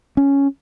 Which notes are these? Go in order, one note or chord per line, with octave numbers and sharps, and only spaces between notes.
C#4